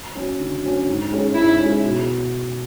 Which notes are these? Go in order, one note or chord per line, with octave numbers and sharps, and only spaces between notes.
F#3 C#4
D3
F#3 C#4
G#2
G#3 C#4
G#2 E4
G#3 C#4
B2